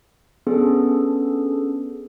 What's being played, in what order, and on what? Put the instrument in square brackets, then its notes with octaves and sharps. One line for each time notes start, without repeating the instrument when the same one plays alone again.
[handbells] B3 C#4 D4 G#4 A4